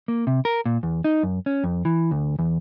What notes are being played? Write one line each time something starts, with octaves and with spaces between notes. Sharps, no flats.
A#3
C3
A#4
A#2
E2
D#4
F#2
C#4
F2
E3
D2
E2